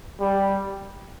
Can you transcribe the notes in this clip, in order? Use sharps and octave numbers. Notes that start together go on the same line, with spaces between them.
G3